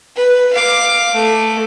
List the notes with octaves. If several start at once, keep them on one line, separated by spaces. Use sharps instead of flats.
B4
F5 D6
A3